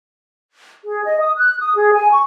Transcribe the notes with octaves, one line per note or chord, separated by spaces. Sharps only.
G#4
D#5
D#6
F#6
D#6
G#4
G#5
C#6